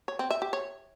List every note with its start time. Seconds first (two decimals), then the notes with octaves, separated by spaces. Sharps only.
0.08 C#5
0.19 C4
0.30 E5
0.42 G4
0.53 C#5